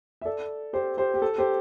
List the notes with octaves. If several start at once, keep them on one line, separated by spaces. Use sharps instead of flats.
E5
A4 D5
G4 C5
G4 C5
G4
A4
G4 C5